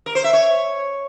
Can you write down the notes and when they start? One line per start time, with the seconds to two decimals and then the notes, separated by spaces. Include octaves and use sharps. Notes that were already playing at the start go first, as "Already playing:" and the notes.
0.06 A#4
0.15 C5
0.24 E5
0.33 C#5